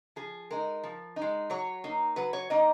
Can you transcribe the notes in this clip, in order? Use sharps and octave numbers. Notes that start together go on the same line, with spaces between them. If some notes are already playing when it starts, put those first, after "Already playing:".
F3 G#4
G#3 D#4 A#4
F3
D#4
G#3
F#3 C#5
A#3 D#4
F#3 B4
C#5
A#3 D#4 D#5